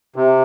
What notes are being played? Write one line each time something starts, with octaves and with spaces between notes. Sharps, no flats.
C3